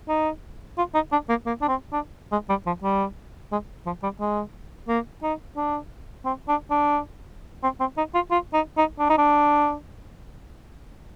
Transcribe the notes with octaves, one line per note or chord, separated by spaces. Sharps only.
D#4
F4
D#4
D4
A#3
A#3
D4
C4
D4
G#3
G3
F3
G3
G#3
F3
G3
G#3
A#3
D#4
D4
C4
D4
D4
C4
C4
D#4
F4
F4
D#4
D#4
D4
D#4
D4